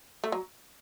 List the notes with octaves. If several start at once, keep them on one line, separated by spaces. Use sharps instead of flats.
A3
F#3